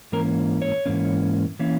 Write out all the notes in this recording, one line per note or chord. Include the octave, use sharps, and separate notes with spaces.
G#2 E3 A#3 C#4 A#4
C#5
G#2 E3 A#3 C#4
E3 A#3 C#4